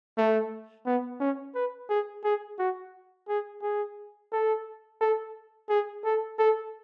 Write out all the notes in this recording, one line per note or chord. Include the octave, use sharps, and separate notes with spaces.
A3
B3
C#4
B4
G#4
G#4
F#4
G#4
G#4
A4
A4
G#4
A4
A4